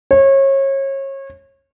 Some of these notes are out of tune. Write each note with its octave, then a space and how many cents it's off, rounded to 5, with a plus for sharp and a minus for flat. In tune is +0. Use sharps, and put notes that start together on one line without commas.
C#5 -30